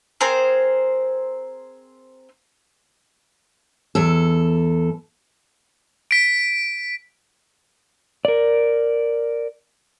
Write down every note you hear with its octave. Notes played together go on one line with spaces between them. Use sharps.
C4 G#4 A#4 C5
E2 A4
B6 D7
A#4 D5